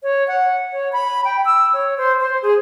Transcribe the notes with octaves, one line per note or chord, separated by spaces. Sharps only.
C#5
F#5
C#5
B5
G5
E6
C#5
C5
C5
G#4